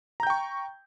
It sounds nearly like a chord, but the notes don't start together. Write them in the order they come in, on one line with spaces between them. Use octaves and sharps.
A#5 G6 G5 C#6